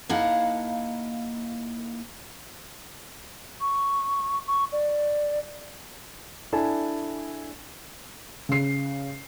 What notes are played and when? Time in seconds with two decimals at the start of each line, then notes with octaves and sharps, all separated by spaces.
0.09 A#3 D#4 E4 F5 F#5 A5
3.61 C#6
4.47 C#6
4.72 D5
6.53 D4 E4 A4 G#5 A5
8.49 C#3 C7